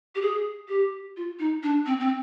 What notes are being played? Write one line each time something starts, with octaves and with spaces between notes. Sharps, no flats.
G4
G#4
G4
F4
D#4
D4
C4
C4